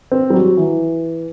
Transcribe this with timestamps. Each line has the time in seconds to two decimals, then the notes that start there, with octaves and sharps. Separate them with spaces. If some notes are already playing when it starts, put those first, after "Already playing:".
0.12 C4
0.30 G3
0.34 F#3
0.57 E3